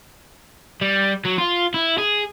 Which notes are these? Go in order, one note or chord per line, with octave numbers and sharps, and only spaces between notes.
G3
F#3
F4
E4
G#4